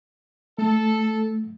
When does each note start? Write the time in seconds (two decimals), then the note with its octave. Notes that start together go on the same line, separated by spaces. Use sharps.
0.58 A3 A4